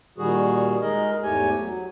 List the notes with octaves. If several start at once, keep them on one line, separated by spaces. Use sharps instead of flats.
A#2 D#3 G3 F#4 G#4
G#3 D#4 G#4 A#4 D#5
E2 G#2 A3 G4 C#5 G#5
F#3